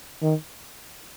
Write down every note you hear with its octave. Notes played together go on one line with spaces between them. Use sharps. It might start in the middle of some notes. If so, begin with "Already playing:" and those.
D#3